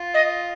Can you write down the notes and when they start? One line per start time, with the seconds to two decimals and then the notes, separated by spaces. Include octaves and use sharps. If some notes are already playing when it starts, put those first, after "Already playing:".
Already playing: F4
0.14 D#5